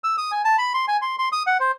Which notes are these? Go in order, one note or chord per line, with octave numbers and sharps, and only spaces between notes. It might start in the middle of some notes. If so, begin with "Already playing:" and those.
E6
D#6
G#5
A5
B5
C6
G#5
C6
C6
D#6
F#5
C5